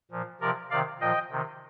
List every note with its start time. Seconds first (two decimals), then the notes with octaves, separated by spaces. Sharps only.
0.11 A#2 F3
0.41 C3 F3 A#4 D5
0.70 C3 D#3 D5 F5
1.00 A#2 F3 D#5 G5
1.31 C3 D#3